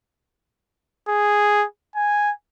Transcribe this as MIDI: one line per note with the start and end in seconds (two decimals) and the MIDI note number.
1.09 1.65 68
1.96 2.31 80